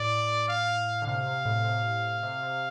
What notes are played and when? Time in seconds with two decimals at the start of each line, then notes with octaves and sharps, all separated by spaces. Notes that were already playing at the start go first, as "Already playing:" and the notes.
Already playing: A2 D5
0.49 F5
1.02 D3
1.07 C3 F5
1.27 C3
1.45 A2
1.64 C3
2.23 C3
2.43 C3